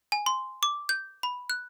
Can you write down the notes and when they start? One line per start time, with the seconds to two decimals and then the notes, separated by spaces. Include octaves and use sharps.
0.12 G#5
0.26 C6
0.63 D6
0.89 G6
1.23 B5
1.50 F#6